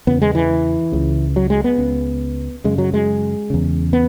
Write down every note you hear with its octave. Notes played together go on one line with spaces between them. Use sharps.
E2 C#3 B3
G#3
E3
C#2 C#3
F#3
G#3
B3
C#2 C#3
F#2 C#3 G#3
F#3
G#3
E2 C#3
B3